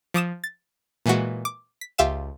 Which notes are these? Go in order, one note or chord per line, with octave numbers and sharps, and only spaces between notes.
F3 D6 D#6 E7
A6
A#2 E3 G#3 F#4
D6
B6
C#2 F4 G4 E5 F5 E7